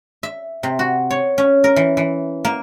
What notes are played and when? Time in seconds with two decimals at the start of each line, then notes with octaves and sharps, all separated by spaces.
0.23 E5
0.63 C3
0.79 F#4
1.11 C#5
1.38 C#4
1.64 A#4
1.76 E3
1.97 E3
2.45 A#3